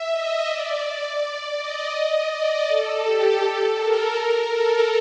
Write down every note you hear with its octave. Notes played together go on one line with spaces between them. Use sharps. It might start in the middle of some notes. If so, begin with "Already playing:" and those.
Already playing: E5
D#5
D5
D#5
D#5
D5
A4
G4
A4
A#4
A4